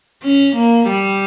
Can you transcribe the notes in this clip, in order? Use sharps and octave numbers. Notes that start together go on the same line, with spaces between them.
C#4
A#3
G3